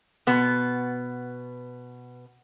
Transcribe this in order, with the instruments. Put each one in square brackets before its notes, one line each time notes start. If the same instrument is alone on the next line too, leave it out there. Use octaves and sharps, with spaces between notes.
[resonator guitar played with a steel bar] B2 B3